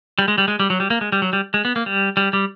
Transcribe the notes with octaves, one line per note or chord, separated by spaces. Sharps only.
G3
G#3
G3
G#3
G3
F#3
G3
A#3
G#3
G3
F#3
G3
G#3
B3
A#3
G3
G3
G3